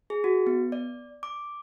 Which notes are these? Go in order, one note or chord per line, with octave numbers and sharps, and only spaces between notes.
G#4
F#4
B3
D5
D6